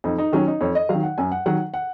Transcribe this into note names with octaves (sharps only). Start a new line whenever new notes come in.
F2 D#4
D#4
D#3 F#3 C#4
D#4
F2 C#5
D#5
D#3 F#3 F5
F#5
F#2 G#5
F#5
D#3 F#3 F#5
F#5